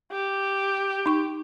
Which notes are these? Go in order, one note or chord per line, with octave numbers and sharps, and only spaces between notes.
G4
D#4 C#6